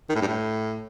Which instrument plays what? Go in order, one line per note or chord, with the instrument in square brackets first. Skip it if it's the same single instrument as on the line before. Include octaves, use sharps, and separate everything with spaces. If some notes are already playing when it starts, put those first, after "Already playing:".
[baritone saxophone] D#3
A2
G2
A2